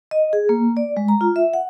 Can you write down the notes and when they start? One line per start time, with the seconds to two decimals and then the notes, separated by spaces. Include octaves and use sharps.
0.11 D#5
0.33 G#4
0.49 A#3
0.77 D5
0.97 G#3
1.08 A#5
1.21 F4
1.36 E5
1.54 F#5